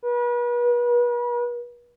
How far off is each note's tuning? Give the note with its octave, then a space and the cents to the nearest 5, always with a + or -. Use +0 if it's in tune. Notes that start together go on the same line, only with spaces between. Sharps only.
B4 -40